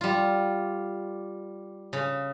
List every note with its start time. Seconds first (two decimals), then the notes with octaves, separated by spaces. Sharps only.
0.01 G3 F4
1.93 C#3